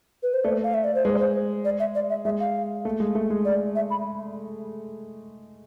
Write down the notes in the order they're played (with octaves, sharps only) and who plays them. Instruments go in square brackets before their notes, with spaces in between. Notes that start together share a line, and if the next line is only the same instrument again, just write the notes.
[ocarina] B4
C5
[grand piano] A3 [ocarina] D5
[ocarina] F5
E5
D5
C5
[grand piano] G#3 [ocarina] B4
[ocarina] D5
C5
D5
E5
D5
E5
[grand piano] G#3 [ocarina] E5
[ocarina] F5
[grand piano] A3
G#3
A3
G#3
[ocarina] D5
E5
B5